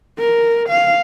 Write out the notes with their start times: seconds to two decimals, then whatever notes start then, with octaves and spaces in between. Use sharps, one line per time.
0.19 A#4
0.69 F5